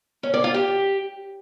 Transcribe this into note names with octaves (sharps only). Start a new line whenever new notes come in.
C#4
D5
F4
G4